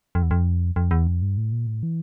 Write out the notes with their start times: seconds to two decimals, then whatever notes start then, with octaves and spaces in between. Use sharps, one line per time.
0.15 F2
0.23 E2
0.31 F2
0.76 F2
0.91 E2
1.07 F2
1.22 G2
1.37 A2
1.52 A#2
1.67 A2
1.83 E3